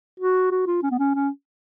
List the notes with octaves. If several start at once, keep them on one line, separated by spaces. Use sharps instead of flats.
F#4
F#4
F4
C#4
B3
C#4
C#4